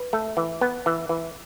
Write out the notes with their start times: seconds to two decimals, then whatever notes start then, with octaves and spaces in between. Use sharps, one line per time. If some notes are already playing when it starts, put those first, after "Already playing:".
Already playing: B4
0.13 A3
0.37 E3
0.61 B3
0.86 E3
1.09 E3